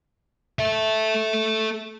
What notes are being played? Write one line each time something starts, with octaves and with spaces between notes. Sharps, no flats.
A4 E5